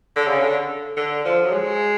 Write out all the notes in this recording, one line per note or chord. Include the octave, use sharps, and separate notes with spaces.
D3
C#3
D3
D3
F3
F#3
G#3